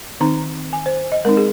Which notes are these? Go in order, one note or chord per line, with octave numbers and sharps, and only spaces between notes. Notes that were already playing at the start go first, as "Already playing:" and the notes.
D#3 C4 D#4 A#5
G#5
C5
D#5
G#3 C4 D#4 A#4
G#4